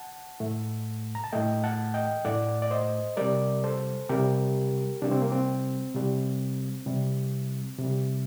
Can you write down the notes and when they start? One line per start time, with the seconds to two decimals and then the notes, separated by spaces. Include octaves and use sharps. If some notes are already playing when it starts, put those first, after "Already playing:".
Already playing: F#5 A5
0.40 A2 A3
1.15 A#5
1.24 A5
1.33 A2 A3 D#5 G5
1.64 F#5 A5
1.94 D#5 G5
2.25 A2 A3 D5 F#5
2.62 D5
2.71 C5 D#5
3.17 C3 G3 A#4 D5
3.64 A4 C5
4.09 C3 G3 G4 A#4
5.02 C3 G3 D4
5.11 C4
5.22 A#3
5.32 C4
5.95 C3 G3
6.86 C3 G3
7.79 C3 G3